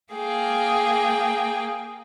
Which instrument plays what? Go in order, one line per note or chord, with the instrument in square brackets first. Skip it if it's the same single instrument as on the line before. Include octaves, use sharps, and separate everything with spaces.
[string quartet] A#3 G#4 F5 G5